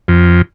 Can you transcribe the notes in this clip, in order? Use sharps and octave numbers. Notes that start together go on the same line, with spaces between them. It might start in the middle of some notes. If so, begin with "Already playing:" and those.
F2